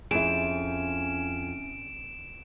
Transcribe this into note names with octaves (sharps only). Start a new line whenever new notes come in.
F2 C#4 E4 G#4 D7 E7